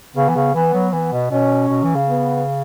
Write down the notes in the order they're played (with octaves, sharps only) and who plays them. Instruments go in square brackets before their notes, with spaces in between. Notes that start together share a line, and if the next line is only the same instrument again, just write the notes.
[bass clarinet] C#3 [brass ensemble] B3
[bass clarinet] E3
C#3
[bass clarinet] E3 [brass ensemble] B3
[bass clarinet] F#3
[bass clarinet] E3 [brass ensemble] B3
[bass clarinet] B2
[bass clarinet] B2 [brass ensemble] C#4
[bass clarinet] B2
E3
C#3
[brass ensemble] B3